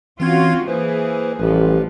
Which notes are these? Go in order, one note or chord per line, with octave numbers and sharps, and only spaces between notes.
E3 C4 C#4 F4 F#4 G#6
E3 A#3 G#4 B4 C5
A1 F3 G3 G4 B4